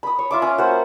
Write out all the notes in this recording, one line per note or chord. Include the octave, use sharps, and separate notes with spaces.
B5 D#6
C#5
F4 E5 D6
C#4
A#3 F#4 C5